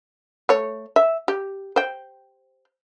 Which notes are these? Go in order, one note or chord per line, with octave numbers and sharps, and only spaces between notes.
A3 C#5
E5
G4
C5 G5